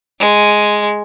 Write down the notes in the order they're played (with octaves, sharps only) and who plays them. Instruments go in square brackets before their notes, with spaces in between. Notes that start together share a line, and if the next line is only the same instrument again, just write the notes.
[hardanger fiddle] G#3